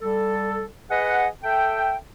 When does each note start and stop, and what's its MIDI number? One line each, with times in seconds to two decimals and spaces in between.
0.01 0.65 55
0.01 0.65 69
0.90 1.26 68
0.90 1.26 71
0.90 1.26 75
0.90 1.26 78
1.43 1.95 69
1.43 1.95 76
1.43 1.95 79